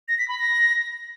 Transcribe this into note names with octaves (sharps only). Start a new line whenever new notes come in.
A#6
B6
B5
A#6